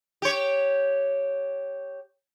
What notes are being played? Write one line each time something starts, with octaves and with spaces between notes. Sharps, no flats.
G4 C#5